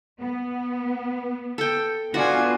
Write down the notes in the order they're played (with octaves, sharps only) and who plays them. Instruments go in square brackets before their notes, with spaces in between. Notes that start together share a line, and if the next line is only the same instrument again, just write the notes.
[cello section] B3
[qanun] A4 G5
[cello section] B3 F4 [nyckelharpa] D4 G#5 [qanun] F#4 F#5